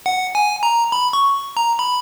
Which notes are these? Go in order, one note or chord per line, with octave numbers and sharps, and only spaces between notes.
F#5
G#5
A#5
B5
C#6
A#5
B5